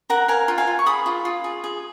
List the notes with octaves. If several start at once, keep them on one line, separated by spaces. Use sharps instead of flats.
A#4 F#5 A#5
A#4 F5 G#5
F4
F5 G#5
F4
C#6
G#4 B5 D#6
F4
F4
G#4
G#4